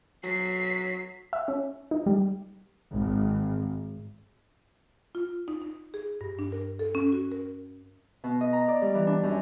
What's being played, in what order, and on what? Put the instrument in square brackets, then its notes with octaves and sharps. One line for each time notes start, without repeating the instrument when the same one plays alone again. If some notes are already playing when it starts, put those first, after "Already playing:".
[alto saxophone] F#3 [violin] B6 C7
[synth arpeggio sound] E5
C#4
D#4
G3
[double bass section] G#1
[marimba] F4
D#4
D#4
G#4
G2
D4
A#4
A4
C#4
F#4
A#4
[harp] B2
D#5
A#5
D5
G3
E3
D4
F#2